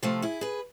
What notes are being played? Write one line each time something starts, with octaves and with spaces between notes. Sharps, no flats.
C3 F3 A3 F4 A4
E4 G#4
G#4 B4